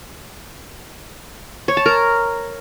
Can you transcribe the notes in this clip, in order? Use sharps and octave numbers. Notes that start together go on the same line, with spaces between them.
C#5
A5
A#4